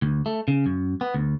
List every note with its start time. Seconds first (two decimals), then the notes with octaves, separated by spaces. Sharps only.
0.02 D2
0.26 A3
0.48 C#3
0.66 F#2
1.01 B3
1.14 D2